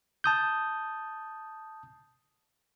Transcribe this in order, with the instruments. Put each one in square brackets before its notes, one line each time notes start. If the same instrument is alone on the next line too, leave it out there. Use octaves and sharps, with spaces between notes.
[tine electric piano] A5 D#6 G6